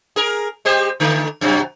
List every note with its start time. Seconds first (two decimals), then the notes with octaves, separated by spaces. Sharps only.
0.16 G#4 A#4
0.65 G#3 G4 C5
1.00 D3 A3
1.41 F#2 C3 F#3